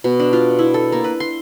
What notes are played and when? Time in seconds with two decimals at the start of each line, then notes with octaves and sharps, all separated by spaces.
0.04 B2
0.20 D4
0.33 F4
0.59 E4
0.74 A4
0.92 A#3
1.04 B4
1.20 C6